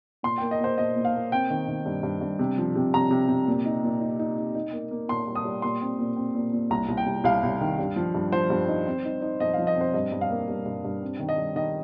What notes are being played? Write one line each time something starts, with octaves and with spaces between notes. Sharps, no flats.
A#2 C6
A#3 G5
D#5
A#2 C5
A#2 D#5
A#2
F5
A#3
C4 G5
D#3
D#3
G2
G2
G2
C3
F3
C3
C3 A#5
C3
C3
A#2
D#4
A#2
D#4
D#4
D#4
D#4
A#3
A#3
A#2 C6
G3
D#6
G3
A#2 C6
C4
A#2
C4
A#2
A#2
C2 A#5
C2
G5
C2
C2 F5
C2
D#3
G2
F3
G2
F3 C5
G2
D#4
C4
D#4
D#4
F2 D#5
F3 F5
D#5
C4 C5
G2 D#5
G2
F5
A#3
G2
G2
G2
C4
D#3
D#5
G3
D#3 D#5